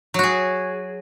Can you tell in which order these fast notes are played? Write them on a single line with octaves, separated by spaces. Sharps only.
F#3 F#4 G#4